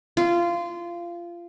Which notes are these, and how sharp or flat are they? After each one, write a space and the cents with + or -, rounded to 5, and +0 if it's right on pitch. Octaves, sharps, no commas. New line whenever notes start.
F4 -20